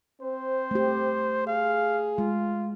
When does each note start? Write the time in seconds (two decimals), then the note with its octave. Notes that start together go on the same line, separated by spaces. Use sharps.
0.22 C4 C5
0.71 A3 G4
1.47 G#4 F5
2.18 G#3 F4